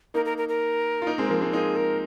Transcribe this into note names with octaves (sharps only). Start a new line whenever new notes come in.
A#3 D#4 A#4
A#4
A#4
A#4
F4
A#3 D#4
G#3 C4
F3 A#3
G#3 C4
A#3 D#4 G#4
A#4